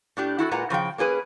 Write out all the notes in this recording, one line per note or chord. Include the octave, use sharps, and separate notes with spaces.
A2 D4 G4
E4 F#4 G4 A4
A#2 G#3 B4 F#5 A#5
C#3 F3 G#4 G5
A#3 C#4 G#4 B4